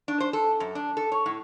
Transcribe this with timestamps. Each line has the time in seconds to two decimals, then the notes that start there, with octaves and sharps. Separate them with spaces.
0.08 D4
0.20 C5
0.33 A4
0.60 F#2
0.75 D4
0.97 A4
1.12 C#5
1.26 A2